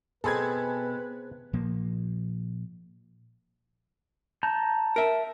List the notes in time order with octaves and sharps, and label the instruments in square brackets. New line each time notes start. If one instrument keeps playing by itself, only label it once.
[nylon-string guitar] B2 [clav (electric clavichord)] C4 G#4 [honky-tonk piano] A4 B5 G#6 [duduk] B4
[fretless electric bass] A#2 F3 A#3
[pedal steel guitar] A5 A#5 G6
[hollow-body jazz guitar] A#4 E5